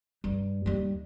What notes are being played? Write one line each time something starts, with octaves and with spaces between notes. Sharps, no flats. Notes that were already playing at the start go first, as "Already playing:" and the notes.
G2
D#2 G3